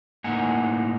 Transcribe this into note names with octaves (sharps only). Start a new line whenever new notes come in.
A2 A#3 D#4 F#5 G#5